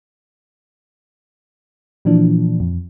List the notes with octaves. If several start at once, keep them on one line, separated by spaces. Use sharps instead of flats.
A#2 E3 F3 D4
F2